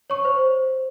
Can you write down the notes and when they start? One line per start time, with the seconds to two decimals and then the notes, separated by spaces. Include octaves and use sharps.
0.10 C#5 C#6
0.25 C5